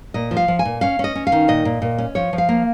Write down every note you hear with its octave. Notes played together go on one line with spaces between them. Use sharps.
A#2 D#5
F3
F5
F3
G#5
A#2
C#4 F5
C#4 D#5
C#4
F5
D#3
A#2 D#5
A#2
A#2
C#4
F3 C#5
F3
F5
A#3